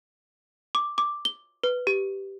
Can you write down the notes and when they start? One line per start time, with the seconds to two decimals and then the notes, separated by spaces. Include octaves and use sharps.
0.75 D6
0.98 D6
1.25 G7
1.64 B4
1.87 G4